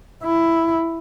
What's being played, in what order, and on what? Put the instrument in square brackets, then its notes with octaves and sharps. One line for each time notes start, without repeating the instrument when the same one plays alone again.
[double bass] E4